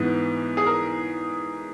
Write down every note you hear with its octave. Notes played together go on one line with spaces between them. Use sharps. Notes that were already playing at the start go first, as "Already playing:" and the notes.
Already playing: G#2 E3 B3
G#4
A#4